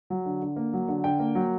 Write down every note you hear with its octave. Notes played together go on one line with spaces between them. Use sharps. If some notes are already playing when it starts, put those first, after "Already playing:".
F#3
D3
D3
A#3
F#3
D3
D3 G5
A#3
F#3